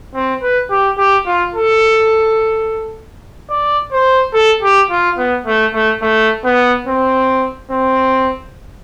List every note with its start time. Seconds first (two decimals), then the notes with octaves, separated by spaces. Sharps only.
0.15 C4
0.42 B4
0.71 G4
0.98 G4
1.26 F4
1.55 A4
3.50 D5
3.92 C5
4.34 A4
4.63 G4
4.90 F4
5.18 B3
5.46 A3
5.74 A3
6.02 A3
6.44 B3
6.87 C4
7.71 C4